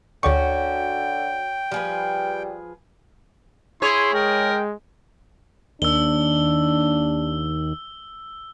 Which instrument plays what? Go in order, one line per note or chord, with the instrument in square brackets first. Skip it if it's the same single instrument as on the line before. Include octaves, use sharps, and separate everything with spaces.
[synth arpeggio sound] D2 D5 C#6 [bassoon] D3 [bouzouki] C#4 F#4 [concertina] G5
[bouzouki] F3 G#4 B4 [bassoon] G3
[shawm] E4 [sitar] G#4 C#5 [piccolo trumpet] C6
[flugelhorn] G#3 [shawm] A#4 [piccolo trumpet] G5
[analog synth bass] D#2 [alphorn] D4 [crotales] E6 G7